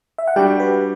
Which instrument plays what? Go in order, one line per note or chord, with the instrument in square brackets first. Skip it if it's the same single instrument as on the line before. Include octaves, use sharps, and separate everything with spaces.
[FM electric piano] E5
F#5
[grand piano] G3 D4 F#4 [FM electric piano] G4 G5
[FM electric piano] B4 B5